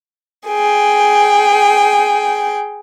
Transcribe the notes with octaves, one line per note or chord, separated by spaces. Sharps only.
G#4 G5